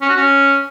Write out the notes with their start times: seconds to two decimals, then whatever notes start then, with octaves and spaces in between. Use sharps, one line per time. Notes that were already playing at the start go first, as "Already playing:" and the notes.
0.01 C#4
0.09 F#4
0.17 C#4